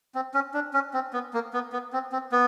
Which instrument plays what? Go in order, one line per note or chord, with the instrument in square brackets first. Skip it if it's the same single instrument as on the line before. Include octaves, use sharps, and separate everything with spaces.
[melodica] C4
C#4
D4
C#4
C4
B3
A#3
B3
B3
C4
C4
B3